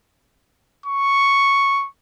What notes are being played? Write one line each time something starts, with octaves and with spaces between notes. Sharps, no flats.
C#6